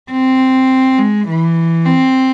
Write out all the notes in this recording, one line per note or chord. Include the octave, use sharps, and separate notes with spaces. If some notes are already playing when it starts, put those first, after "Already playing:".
C4
G#3
E3
C4